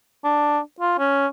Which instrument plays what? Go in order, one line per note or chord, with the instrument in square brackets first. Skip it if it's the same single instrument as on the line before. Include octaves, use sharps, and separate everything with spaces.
[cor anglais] D4
F4
C#4